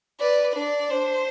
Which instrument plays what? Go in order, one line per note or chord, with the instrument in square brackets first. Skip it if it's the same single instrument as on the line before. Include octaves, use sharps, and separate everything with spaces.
[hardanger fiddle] B4 [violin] D5
[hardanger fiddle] D4 [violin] D5
[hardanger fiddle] D4 [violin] C5